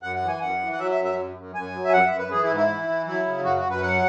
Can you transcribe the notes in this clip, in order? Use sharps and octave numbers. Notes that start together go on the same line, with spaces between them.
F#2 F#5
F#5
E3
G#5
F#2 F#5
E3
F#5
F#3 E5
E5
F#2
E5
F#2
F#2
F#2 G#5
F#3
E5
F#2 F#5
E5
F#2
B4
E3 G#4
E4
G#2
E4
E3
E3
F#3 E4
C#3
F#2 F#4
F#4
F#2
B4
F#3 F#5